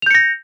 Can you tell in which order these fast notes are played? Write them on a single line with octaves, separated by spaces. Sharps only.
F7 G6 C#7 A#6